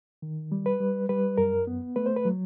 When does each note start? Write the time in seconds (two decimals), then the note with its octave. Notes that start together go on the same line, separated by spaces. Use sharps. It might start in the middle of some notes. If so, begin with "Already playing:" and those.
0.22 D#3
0.52 G3
0.66 B4
0.80 G3
1.09 G3 B4
1.38 F#2 A#4
1.67 B3
1.96 A3 B4
2.06 C5
2.16 B4
2.25 F#3